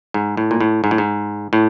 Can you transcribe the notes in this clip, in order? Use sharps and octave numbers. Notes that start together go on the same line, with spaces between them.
G#2
A2
A#2
A2
G#2
A2
G#2
A2